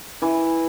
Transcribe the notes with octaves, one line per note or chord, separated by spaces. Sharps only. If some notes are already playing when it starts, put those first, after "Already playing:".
E3